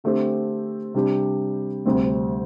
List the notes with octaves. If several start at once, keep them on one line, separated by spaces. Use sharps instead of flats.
D3 A3 C4 G4
C3 G3 D4 G4
D2 C3 G3 C4